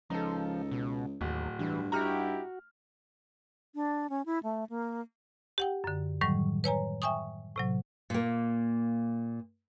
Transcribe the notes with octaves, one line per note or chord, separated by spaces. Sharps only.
C#2 F3 D#4 A4
B2
D1 D#2
G2 E3
D#4 E4 F#4 G4 A#5 F6
D4
C#4
E4
A3
A#3
G4 F#5 G5
F#2 D3
A2 D#3 F#3 G3 C#6
B4 C#5 G#5 A#5
E5 G5 G#5 C#6 D#6
A2 C3 F#3
A#2 A#3